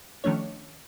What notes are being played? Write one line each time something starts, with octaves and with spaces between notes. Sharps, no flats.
D#3 F3 A3 C#4 D4 C#5